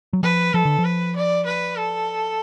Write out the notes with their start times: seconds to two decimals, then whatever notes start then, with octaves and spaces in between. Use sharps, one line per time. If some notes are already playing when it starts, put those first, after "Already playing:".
0.13 F#3
0.23 F3 B4
0.53 F3 A4
0.65 D3
0.79 F3
0.84 B4
1.16 D5
1.46 B4
1.76 A4